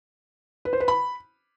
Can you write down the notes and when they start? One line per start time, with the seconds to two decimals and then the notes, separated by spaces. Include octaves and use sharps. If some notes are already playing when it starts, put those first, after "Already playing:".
0.65 B4
0.73 C5
0.80 B4
0.88 B5